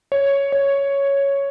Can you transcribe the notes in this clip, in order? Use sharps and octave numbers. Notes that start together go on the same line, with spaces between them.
C#5
C#5